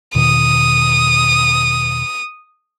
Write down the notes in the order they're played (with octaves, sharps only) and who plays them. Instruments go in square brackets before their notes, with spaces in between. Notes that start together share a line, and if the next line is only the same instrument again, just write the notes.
[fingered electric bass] E2 B2 D#3 [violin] D#6